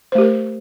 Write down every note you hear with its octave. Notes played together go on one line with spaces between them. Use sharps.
A3 G4 A#4 C5